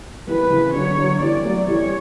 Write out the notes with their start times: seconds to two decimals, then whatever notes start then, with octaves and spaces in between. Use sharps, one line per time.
0.27 E3 G3 B4
0.50 C#3 E3
0.73 D3 F#3 C#5
0.97 D3 F#3
1.20 E3 G3 D5
1.44 F#3 A3
1.67 E3 G3 C#5